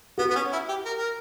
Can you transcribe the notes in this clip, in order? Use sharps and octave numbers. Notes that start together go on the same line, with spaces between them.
B3 F#4
B3
C#4
E4
G4
A#4
A#4